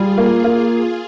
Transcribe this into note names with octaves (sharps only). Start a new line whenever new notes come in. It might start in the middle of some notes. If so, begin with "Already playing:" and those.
Already playing: G3 F4 G#4
A#3
A#3